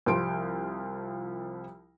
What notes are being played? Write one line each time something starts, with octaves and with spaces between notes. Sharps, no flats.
C2 F3 G3 C6 D7